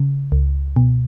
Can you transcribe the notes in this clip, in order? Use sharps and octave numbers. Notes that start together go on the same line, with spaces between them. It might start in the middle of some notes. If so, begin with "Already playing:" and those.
Already playing: C#3
C#2
B2